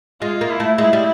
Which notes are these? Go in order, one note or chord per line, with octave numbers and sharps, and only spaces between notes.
G#3 F4
A#3
E4
A3
G#3 E4
G3